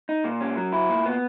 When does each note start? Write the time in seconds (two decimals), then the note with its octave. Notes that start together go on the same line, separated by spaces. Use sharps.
0.09 D#4
0.24 A#2
0.41 C#4
0.57 F#3
0.73 E4
0.89 A#2
1.06 B3